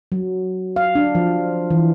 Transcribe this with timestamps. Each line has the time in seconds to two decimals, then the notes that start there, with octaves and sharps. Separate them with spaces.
0.12 F#3
0.76 F5
0.95 D4
1.15 F3
1.71 E3